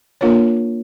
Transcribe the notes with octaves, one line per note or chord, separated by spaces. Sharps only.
A#3 D4 F4 A#4 C#5